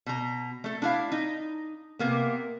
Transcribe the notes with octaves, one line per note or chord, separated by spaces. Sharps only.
B2 A#5
A3 A4
D4 E4 F5
D#4
C3 A#3 B3